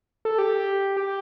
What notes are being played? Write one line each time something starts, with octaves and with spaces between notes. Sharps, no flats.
A4
G4
G4